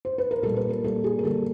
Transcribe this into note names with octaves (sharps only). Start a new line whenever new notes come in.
C5
B4
A#4
A#2 G3 A#3 A4
B4
A#4
A#2 G3 A#3 A4
G#4
A#4
D3 G3 A#3 A4